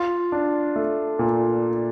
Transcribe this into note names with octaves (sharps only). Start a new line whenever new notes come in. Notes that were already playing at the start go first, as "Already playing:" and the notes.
Already playing: F4
D4
A3
A#2